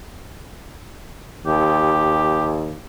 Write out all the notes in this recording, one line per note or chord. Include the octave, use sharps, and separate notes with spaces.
D#2 G4